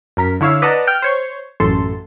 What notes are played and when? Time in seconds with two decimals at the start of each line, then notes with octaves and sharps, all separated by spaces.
0.17 F#2 A#4 B6
0.41 D3 E4 C#5 F5 E6
0.62 B4 D5 D#5 F#5 A5 A#5
0.87 G5 F6
1.02 C5 C#5 C#6
1.60 A1 F#2 A4 C6